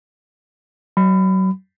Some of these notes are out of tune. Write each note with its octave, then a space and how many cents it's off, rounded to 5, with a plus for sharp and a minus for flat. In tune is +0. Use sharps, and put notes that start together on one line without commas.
F#3 +30 B5 +25